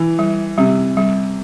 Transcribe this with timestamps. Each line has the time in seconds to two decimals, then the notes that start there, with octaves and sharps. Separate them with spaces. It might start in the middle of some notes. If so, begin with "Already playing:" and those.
Already playing: E3
0.19 G3
0.57 C3 G3
0.97 G3